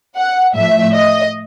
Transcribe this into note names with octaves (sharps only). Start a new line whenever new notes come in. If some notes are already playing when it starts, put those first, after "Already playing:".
F#5
A2 F3 E5
D#5